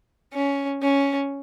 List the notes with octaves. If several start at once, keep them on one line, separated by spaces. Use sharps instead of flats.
C#4
C#4